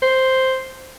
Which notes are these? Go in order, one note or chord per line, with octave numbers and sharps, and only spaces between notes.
C5